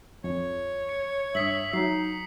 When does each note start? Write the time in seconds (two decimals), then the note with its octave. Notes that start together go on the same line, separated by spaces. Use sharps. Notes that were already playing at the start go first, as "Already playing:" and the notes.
0.24 F2 C#5
0.89 C#7
1.35 G2 E5 D#6 B6 F#7
1.73 F#3 D#4 C7